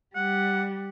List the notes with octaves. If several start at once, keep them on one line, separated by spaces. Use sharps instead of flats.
G3 F#5